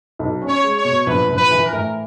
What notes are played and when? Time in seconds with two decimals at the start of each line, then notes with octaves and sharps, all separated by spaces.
0.19 B1
0.42 C#4
0.48 C#5
0.63 G#3
0.78 C#5
0.85 B2
1.07 A#1 B4
1.29 A#1
1.36 B4
1.51 E3
1.65 A#4
1.72 A2